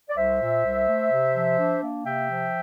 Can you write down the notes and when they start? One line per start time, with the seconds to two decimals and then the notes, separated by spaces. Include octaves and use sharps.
0.10 D5
0.17 C2 C5 E5
0.40 A#2
0.65 C2
0.87 A3
1.12 C3
1.34 F3
1.58 D4
1.82 A#3
2.05 C3 E5 G5
2.29 F3